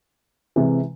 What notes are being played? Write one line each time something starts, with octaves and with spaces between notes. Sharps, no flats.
C3 E3 G#3